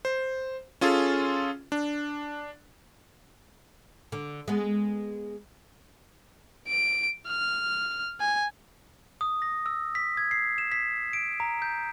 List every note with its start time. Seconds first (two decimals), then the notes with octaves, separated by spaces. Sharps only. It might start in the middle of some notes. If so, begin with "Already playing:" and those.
0.05 C5
0.81 C#4 F4 G#4 A4
1.72 D4
4.12 D3
4.48 G#3 B3
6.68 D7
7.29 F6
8.20 G#5
9.21 D#6
9.42 A#6
9.66 E6
9.95 B6
10.17 G#6
10.31 C7
10.58 E7
10.72 B6
11.13 D7
11.40 A#5
11.62 G6